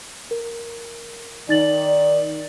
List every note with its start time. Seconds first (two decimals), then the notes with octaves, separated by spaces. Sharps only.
0.31 A#4
1.49 D#3 D#4 D5 A6 F#7